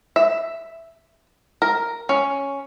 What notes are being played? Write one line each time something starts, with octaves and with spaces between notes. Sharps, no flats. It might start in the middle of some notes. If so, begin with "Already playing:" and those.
E5
A#4
C#4